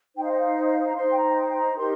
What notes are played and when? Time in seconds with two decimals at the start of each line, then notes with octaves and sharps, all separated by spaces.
0.16 D#4 C5 G5
0.24 F5
0.31 D#5
0.38 F5
0.85 A#5
0.96 D#4 C5 C6
1.12 G5
1.16 A#5
1.37 G5
1.48 G5
1.56 A#5
1.76 D#4 G4 A#4 C6